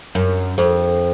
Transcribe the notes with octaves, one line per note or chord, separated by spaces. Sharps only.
F#2
F2